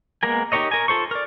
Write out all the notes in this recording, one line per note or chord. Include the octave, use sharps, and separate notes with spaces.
G#3 A#3 B3 A#4 G#5
D#4 G4 A#4 C#5 D#5
A#4 G#5
F4 A4 C5 C#6
A#4 D5